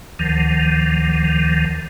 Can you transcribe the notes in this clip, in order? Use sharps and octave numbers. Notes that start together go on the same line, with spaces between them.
D2 D#3 F3